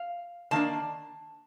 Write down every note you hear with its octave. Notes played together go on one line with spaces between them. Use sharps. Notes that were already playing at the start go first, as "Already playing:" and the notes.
Already playing: F5
D#3 A#3 D4 A5